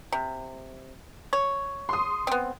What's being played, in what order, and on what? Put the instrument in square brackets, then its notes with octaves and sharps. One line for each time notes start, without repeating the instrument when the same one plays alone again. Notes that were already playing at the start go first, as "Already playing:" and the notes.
[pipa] C3
C#5
[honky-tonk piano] C6 D#6
[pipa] B3 C4